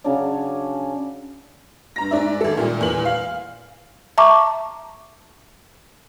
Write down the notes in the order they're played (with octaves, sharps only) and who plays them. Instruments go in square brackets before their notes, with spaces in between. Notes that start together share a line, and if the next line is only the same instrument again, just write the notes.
[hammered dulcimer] C#3 F#3 C#4 D4
[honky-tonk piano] G2 A#5 A#6
G#2 D5 E5
G#1 A4
A#2 G3
E2 A#2 F#7
F5
[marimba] E5 A5 A#5 C#6 D6